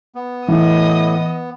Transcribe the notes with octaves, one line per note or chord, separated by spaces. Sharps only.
B3
A2 E3 D#5 D#6